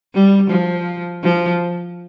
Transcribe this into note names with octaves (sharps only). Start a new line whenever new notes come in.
G3
F3
F3